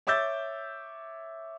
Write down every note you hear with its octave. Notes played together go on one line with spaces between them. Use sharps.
C#5 E5 D6 E6 G6 A6